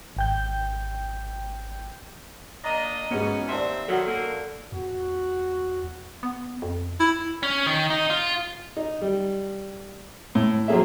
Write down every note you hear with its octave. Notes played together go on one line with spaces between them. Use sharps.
G#1 G5 G6
A#3 D4 D#5 A#5
G#2 B2 E3 B3 C#4
D#2 C4 D5 E5 A5 C6
B2 D#3 F#3 A4 F#5
F#2 A#3 A4
E2 F#4
B3
F2
E4
C#4
D#3
D#4
F4
D#4
G3
A2
F3 F#3 A3 A#3 G#4 E5